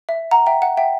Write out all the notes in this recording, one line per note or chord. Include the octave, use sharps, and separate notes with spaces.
E5
F#5 A#5
E5 G5
F#5
E5 G5